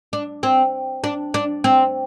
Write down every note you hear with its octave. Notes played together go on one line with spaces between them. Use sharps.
D4
C4
D4
D4
C4